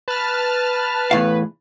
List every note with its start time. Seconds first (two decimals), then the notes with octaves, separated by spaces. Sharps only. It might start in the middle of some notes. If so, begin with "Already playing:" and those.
0.08 B4 A5 F6
1.11 E2 A2 F5